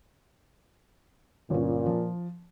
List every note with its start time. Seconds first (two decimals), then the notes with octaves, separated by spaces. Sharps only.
1.50 G1 A#2 C#4
1.86 F3